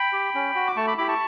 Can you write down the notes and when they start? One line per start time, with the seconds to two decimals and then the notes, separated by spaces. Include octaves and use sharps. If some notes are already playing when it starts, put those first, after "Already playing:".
Already playing: G5 B5
0.13 G4
0.35 C#4
0.55 F#4
0.67 D6
0.76 A3 A5 C#6
0.87 B5 D6
0.98 E4 G4 B5 D6
1.08 A5 C#6